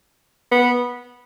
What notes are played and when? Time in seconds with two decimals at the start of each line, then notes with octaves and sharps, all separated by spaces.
0.51 B3